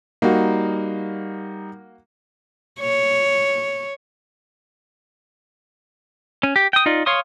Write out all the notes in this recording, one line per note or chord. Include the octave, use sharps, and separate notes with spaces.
G3 A#3 D#4 F#4
C#5
C#4
G4
G5 D#6
D#4 F4 D5
C#5 F5 C6 D#6